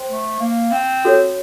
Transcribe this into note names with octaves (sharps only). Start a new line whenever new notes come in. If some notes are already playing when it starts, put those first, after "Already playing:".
Already playing: C5 G5 C6
A3
A#3
C4
F#4 A4 C#5